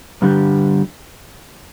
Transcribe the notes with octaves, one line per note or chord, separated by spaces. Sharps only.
G2 D3 G3